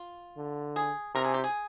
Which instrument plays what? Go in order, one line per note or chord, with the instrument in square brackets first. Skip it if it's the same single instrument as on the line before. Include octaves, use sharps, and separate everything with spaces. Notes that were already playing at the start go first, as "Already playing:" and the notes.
Already playing: [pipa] F4
[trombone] D3
[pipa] G#4
[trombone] C3 [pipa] A#4
[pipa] G#4
G4
G#4